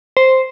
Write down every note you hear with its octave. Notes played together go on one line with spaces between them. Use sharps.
C5